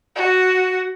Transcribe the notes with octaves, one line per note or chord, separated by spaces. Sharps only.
F#4